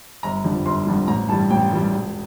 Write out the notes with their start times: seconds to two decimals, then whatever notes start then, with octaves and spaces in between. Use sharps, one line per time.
0.23 G1 A#5
0.45 F2 D3 G3
0.66 G1 C6
0.87 F2 D3 G3
1.08 A1 A#5
1.29 G2 E3 G3 A5
1.50 A1 G5
1.71 G2 E3 G3
1.93 E1